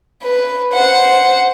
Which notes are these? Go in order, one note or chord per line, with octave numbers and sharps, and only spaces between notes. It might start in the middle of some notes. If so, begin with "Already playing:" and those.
B4
C5 F#5